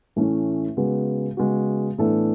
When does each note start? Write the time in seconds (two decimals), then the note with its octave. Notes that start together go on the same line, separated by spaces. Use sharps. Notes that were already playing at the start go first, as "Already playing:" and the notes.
0.16 A2 E3 A3 C#4 E4
0.77 C#3 G#3 B3 F#4
1.37 C#3 G#3 B3 F#4
1.98 A2 E3 B3 D4 A4